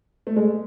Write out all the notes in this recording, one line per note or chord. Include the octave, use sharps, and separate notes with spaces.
A3
G#3